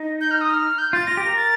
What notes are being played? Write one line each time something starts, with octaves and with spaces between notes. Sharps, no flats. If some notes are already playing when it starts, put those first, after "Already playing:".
Already playing: D#4
G6
F6
D#6
F6
G6
F4 A6
F4 A#6
G4
A#4
A6